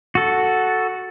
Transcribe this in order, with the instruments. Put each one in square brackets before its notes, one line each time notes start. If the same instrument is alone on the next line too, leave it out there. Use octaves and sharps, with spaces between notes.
[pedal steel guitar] F#4 A4